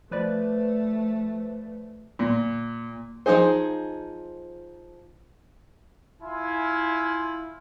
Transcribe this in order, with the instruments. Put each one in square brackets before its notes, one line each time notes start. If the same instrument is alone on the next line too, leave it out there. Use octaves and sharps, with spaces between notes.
[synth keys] F3 B4 D5 [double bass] A3
[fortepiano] A#2
[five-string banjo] F3 C4 D#4 G#4 C5
[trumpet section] E4 F4 F5 G#5